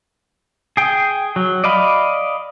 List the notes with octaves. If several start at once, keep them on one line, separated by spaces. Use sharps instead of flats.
G#4 G5
F#3
D5 D#5 F5 B5